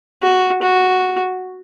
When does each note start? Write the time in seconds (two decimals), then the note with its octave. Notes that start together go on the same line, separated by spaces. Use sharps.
0.22 F#4
0.62 F#4